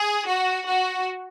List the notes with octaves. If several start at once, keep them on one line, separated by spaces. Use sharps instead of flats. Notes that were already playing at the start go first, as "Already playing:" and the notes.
Already playing: G#4
F#4
F#4